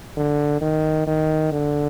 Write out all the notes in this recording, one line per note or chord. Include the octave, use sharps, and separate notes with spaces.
D3
D#3
D#3
D3